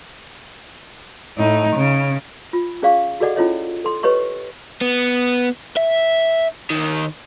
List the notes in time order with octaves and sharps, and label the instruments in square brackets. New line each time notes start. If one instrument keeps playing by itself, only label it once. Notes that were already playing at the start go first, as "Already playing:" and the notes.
[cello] A2 D#4
C#3
[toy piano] F4
C#4 G#4 D5 F5 C#6
F#4 G#4 A4 D5 D#5 F#5
C#4 E4 F4 A4 C#5 D#5
A4 C6
G4 B4 C#5 D#5 C#6
[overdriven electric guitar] B3
E5
D#2 D#3